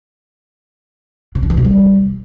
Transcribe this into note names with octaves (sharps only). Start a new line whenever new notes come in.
C3
D3
E3
B2
G3